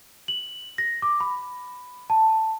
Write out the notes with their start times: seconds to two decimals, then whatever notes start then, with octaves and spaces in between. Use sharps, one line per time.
0.28 F#7
0.78 A#6
1.02 D6
1.20 B5
2.10 A5